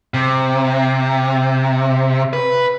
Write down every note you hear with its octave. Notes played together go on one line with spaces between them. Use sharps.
C3
B4